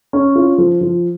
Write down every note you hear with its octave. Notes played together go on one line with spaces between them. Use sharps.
C#4
F4
F3
F3